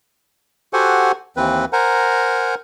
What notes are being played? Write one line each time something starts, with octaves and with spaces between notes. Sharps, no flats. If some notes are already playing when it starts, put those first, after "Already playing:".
F#4 G4 A4 C5 F#5 G#5
D#2 E3 C4 B4
A#4 C5 F#5 G#5 A#5